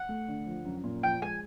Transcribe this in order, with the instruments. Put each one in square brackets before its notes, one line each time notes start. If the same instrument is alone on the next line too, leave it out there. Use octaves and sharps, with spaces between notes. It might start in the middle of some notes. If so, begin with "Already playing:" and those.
Already playing: [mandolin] F#5
[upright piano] A3
D3
F3
F#2
A#2
[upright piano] F3 [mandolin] G5
[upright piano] G#3 [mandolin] G#5